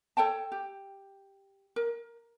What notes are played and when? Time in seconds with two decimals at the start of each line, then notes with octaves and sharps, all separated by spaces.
0.17 A4 C#5 G5 A5
0.52 G4
1.76 A#4